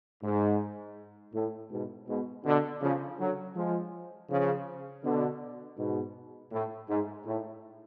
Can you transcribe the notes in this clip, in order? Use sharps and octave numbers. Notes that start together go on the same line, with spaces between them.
G#2
A2
G#2 B2
G#2 B2
B2 D3
C#3 F3
D3 F#3
F3 G#3
C#3 F3
B2 D3
G#2 B2
A2
G#2
A2